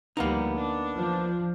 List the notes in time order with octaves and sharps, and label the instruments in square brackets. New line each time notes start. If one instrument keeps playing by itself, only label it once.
[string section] D2 F3 G3 [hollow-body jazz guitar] A#3 B3 D#4
[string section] D4
[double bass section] F3